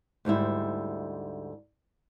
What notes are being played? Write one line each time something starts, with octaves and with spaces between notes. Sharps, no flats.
D2 G#2 G3 E4